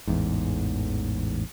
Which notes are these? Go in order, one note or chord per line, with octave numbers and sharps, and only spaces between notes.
A1 E2 G#2